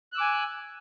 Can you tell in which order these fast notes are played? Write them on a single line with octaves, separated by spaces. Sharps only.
F#6 E6 D6 G#5